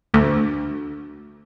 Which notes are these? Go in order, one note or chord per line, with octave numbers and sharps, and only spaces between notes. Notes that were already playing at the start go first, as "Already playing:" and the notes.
D2